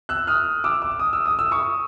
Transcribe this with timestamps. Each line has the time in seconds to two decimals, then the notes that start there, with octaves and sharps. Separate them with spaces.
0.09 E6 F#6
0.27 D#6 F6
0.64 D6 E6
0.82 D6 E6
0.99 D#6
1.13 E6
1.26 D#6
1.39 E6
1.51 C#6 D#6